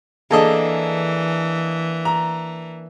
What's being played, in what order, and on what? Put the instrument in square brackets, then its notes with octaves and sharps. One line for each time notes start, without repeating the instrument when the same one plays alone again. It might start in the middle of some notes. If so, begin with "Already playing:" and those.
[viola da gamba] E3 [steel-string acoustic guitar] A#3 D4 [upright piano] G#4 A4 D#5
[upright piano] A#5